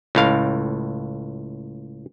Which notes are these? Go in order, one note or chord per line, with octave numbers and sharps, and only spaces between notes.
C#2 A2 F5